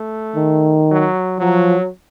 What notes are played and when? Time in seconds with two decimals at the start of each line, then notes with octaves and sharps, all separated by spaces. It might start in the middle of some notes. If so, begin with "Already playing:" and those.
Already playing: A3
0.36 D#3
0.88 F#3
1.39 F3 F#3